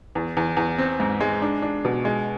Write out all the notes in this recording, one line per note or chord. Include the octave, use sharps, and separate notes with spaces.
E2
E2
E2
C4
G#2
G#3
D4
D4
B2
G#3